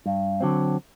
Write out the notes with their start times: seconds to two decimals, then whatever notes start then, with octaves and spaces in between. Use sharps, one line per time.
0.06 G2
0.40 D3 F#3 C4